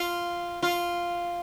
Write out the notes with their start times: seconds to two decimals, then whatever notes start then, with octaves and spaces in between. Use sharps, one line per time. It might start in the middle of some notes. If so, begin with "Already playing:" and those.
Already playing: F4
0.62 F4